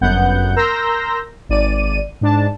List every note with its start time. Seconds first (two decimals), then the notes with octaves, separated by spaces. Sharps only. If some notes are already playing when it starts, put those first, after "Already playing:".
0.01 G1 F#2 B3 F#5 G6
0.56 A#4 A#5 C6 E6 G6 A#6
1.49 G#1 D5 D#7
2.21 G#2 D4 A5